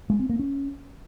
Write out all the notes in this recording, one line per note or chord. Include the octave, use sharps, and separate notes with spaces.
G#3
C4
A#3
C#4